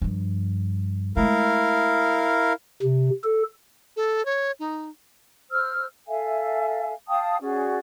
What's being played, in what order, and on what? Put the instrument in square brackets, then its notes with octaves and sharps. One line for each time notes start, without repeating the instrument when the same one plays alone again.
[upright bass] G2 F3
[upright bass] G#3 A3 [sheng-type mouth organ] E4 A#4 F5
[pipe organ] C3
A4
[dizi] A4
C#5
D#4
[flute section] C5 E6 F6
A4 E5 F5 G#5
F5 G5 A5 D#6
C#4 F#4 G#4 D5